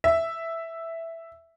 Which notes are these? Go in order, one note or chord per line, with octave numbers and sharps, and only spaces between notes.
E5